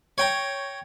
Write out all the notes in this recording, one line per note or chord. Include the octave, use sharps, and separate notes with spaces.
C#5 G5 A#5